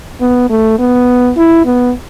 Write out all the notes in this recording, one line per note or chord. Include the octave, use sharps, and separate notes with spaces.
B3
A3
B3
E4
B3